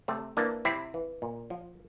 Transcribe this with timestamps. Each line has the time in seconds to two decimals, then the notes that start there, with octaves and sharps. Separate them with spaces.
0.08 C3 A3 C4
0.37 E3 A#3 D4
0.65 C3 C4 E4
0.94 E3
1.22 A#2
1.50 F3